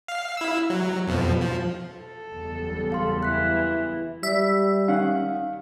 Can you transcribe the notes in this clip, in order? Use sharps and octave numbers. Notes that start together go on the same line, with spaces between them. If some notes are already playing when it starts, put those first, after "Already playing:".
F5
E4 E6
F#3
F2 B2 F3
F3
A4
F#1 E2 G3
F5 C6
E3 F#6 B6
G3 E5
D#3 C#4 F5 F#5